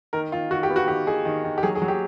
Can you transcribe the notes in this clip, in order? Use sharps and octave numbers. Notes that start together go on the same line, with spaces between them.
D#3 A#4
D#3 F4
D#3 F#4
G4
B3
F#4
D#3 G4
D#3 G#4
D#3
D#3
G4
F#3 G#4
G#4
F#3
G4